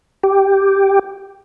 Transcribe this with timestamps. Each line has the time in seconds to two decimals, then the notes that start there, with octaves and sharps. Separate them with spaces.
0.23 G4